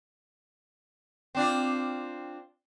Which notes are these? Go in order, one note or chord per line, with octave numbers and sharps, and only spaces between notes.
C4 D4 F4